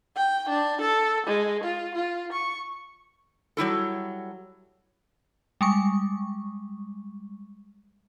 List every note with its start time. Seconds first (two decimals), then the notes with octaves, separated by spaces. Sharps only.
0.16 G5
0.49 D4
0.81 A4
1.26 G#3
1.64 F4
1.95 F4
2.32 C#6
3.57 F#3 G3 E4 A4
5.61 G3 G#3 C#6